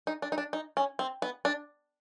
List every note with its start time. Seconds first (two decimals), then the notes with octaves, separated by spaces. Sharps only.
0.07 D#4
0.22 D4
0.32 D#4
0.38 D4
0.53 D#4
0.77 C#4
0.99 C4
1.22 B3
1.45 D4